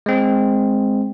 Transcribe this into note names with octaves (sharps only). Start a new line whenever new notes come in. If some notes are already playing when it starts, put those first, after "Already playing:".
G#3 C4